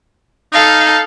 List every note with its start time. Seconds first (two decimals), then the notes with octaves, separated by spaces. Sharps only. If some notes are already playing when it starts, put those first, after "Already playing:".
0.52 D#4 A4 F5